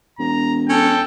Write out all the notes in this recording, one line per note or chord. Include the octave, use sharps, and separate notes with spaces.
E1 A#5
C#4 A4 G5